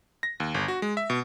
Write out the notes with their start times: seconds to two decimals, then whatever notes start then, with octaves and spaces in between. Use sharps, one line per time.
0.23 A#6
0.40 D#2
0.54 G1
0.68 F#4
0.82 G#3
0.97 E5
1.10 B2